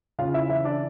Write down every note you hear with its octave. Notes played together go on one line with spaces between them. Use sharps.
C#3 F4 F5
E4 E5
E3 E4 E5
D4 D5